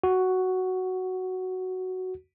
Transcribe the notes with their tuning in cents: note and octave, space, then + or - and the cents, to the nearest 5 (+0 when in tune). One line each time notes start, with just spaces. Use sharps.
F#4 +5